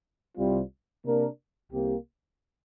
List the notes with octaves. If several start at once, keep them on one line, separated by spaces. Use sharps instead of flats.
C2 C3 G3 C4 F4
C3 A#3 D4 A#4
C2 C3 A#3 G4